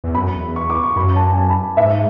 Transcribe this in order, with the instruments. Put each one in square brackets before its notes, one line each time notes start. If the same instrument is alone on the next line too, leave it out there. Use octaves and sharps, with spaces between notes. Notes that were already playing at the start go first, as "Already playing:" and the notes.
[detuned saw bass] E2
[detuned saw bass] F#2 [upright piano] B5
[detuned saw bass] E2
[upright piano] C#6
D6
C#6
[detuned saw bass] F#2 [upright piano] B5
[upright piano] A5
G#5
A5
B5
[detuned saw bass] G#2 [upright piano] E5